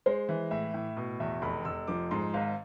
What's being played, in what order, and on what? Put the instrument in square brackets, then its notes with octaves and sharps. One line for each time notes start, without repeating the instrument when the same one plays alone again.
[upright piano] G#3 [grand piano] C5
[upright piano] E3
[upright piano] A2 [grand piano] E5
[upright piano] A2
B2
[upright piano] E2 [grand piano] E5
[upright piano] F1 [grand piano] B5
[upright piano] F1 [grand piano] E6
[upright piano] F3 [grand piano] D6
[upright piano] G#2 [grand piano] C6
[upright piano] G#1 [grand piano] F5